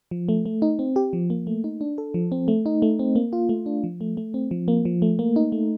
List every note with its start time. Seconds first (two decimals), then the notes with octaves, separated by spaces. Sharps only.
0.11 F3
0.29 A3
0.46 A3
0.62 D#4
0.79 C4
0.96 G4
1.13 F3
1.30 A#3
1.47 A3
1.64 D#4
1.81 D4
1.98 A4
2.14 F3
2.32 C4
2.48 A3
2.66 D#4
2.82 A3
2.99 C4
3.16 A#3
3.33 F4
3.49 A3
3.66 D4
3.84 F3
4.01 A3
4.17 A3
4.34 C4
4.51 F3
4.68 A#3
4.85 F3
5.02 A3
5.19 A#3
5.36 D#4
5.52 A3